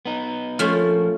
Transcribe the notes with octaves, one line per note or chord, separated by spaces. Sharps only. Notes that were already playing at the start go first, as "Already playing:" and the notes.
B3 D#4
F3 A3 A#3 C#4 F4